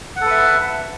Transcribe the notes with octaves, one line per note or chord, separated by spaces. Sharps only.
A4 B4 E5 F#5